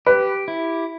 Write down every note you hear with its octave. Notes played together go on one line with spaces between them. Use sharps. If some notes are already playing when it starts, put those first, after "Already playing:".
G4 B4
E4